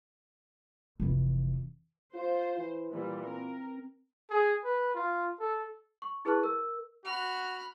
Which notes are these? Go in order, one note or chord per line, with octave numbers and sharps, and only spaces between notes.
F1 E3
F4 C5
E3
A#2 E3 G3
C4 A#4
G#4
B4
F4
A4
C#6
E4 G#4 B4 A5 C#6 F#6
A#4 E6
F#4 B5 F6